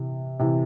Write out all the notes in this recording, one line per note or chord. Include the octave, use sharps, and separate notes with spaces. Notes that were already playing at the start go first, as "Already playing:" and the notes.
Already playing: C3 E3
C3 E3